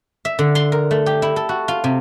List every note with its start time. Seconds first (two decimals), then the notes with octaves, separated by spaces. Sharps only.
0.25 E5
0.39 D3
0.55 C6
0.72 A#4
0.91 A3
1.06 G4
1.22 E4
1.36 A4
1.49 F#4
1.68 F4
1.84 C3